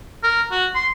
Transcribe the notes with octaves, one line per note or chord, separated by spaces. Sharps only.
A#4
F#4
C6